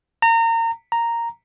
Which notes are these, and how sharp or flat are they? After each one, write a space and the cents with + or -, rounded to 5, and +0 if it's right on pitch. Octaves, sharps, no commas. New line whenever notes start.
A#5 -30
A#5 -5